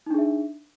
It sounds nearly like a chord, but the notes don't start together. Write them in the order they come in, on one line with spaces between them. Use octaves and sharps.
D#4 D4 G#4 E5